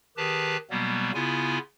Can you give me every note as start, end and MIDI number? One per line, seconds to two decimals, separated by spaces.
0.17 0.57 51
0.17 0.57 67
0.17 0.57 68
0.17 0.57 71
0.17 0.57 81
0.70 1.11 47
0.70 1.11 54
0.70 1.11 55
0.70 1.11 58
0.70 1.11 59
1.14 1.58 49
1.14 1.58 59
1.14 1.58 64
1.14 1.58 65
1.14 1.58 80